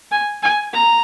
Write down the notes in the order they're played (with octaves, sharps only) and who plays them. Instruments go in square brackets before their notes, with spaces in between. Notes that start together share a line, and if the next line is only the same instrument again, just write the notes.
[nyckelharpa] G#5
G#5
A#5